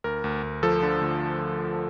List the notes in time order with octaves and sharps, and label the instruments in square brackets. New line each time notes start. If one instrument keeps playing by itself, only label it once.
[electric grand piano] D2 A#4
D2
D2
F3 A4
D3
D2